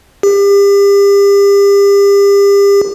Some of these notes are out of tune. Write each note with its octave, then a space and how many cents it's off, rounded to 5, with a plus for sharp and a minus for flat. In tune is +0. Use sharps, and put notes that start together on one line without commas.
G4 +35